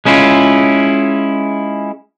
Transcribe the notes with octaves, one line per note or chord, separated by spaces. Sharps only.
G#3 C#4 E4 F4